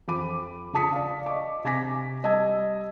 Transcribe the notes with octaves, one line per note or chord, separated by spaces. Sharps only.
F2 F3 B5 D6 D#7
C#3 F4 A5 D#6 B6 C#7
D5 F5
D#5 C#6 D6
C3 G#5 D6 A#6 B6
G3 D#5 A5 E6 G#6